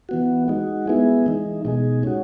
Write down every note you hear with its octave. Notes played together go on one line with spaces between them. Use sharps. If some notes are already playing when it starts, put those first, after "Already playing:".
E3 B3 F#4
G#3 D#4 F#4
G#3 B3 E4 G#4
E3 G#3 D#4
B2 G#3 D#4 G#4
G#3 C#4 F#4